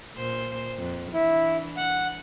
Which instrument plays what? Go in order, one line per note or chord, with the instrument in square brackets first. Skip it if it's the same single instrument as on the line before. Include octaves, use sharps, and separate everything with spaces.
[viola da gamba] A#2 C5
F2
[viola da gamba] E3 D4 [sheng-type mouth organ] E4
[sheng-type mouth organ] F#5